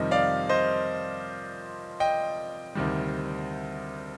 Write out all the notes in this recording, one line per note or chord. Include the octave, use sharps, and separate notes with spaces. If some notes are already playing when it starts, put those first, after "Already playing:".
Already playing: F2 C3 D#3 G3 D#5
D5 F5
C5 D#5
D#5 G5
D2 C3 D#3 G3